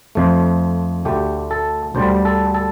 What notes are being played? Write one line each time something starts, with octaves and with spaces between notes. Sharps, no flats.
F2 F3 A3
D2 D3 A3 G4
A4
D2 D3 G3 C5
A4
A4